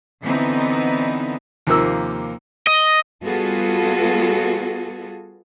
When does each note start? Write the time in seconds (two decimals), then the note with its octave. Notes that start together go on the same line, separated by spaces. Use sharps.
0.22 D3 E3 B3 C4 D#4
1.67 D#2 C3 F3 A#3 E6
2.67 D#5
3.23 G3 B3 F4 F#4 G#4 A4